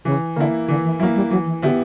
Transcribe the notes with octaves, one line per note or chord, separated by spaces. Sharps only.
C#3 E3
D3 A#3 E4
D3 E3
E3
F#3 A#3 E4
G3
E3 F#3
E3
D3 B3 E4 G4